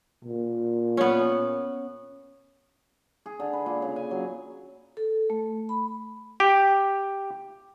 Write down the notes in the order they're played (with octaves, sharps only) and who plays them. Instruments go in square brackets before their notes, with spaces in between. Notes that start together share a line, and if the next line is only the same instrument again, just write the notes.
[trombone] A#2
[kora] B3 C#4
[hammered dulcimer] G#4
D3
B4
A#2
C#3
G#5
F#3
[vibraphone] A4
A3
B5
[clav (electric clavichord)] G4